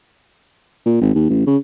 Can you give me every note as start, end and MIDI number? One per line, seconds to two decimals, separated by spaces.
0.86 0.98 46
1.01 1.13 32
1.15 1.27 39
1.30 1.44 33
1.46 1.57 49